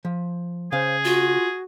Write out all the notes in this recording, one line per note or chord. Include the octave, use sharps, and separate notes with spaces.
F3
C#3 G#4 C5 F5
F4 F#4